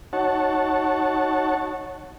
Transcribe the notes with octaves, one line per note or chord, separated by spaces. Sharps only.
D#4 F#4 C#5 F#5 A5